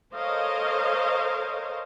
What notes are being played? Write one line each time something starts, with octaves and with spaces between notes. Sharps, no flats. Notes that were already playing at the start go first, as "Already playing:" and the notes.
A4 A#4 C5 C#5 D#5 F5